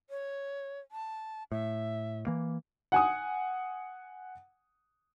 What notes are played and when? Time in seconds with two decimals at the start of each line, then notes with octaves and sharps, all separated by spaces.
0.10 C#5
0.92 A5
1.52 A2 E5
2.27 E3 A#3
2.92 F#5 G#5 D#6